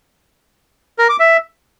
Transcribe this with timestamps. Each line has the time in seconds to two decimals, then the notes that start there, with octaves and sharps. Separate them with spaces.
0.99 A#4
1.09 D6
1.20 E5